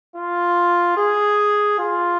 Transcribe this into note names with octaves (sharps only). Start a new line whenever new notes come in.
F4
G#4
F4